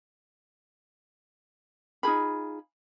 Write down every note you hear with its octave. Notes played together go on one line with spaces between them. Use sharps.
D#4 F4 G#4 B5